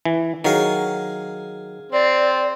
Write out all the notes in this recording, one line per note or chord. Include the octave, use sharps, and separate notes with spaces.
E3
D#3 F#3 G#4 F5 G#5
C4 D5